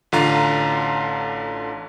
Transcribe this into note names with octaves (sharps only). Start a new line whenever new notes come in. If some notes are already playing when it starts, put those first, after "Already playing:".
A1 D3 F4 F5 A#5